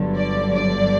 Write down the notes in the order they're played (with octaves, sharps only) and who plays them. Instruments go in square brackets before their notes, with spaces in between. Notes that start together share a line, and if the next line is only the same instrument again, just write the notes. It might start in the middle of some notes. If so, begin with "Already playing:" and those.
Already playing: [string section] G1 G2 D3 F#3
D5
D5